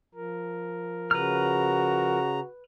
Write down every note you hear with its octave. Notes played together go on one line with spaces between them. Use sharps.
F3 A#4
C#3 F#4 B4 A#5 F6